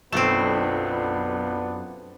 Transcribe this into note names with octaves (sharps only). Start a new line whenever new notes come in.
B1 F#2 A3 B3 C4 D4 F4 E7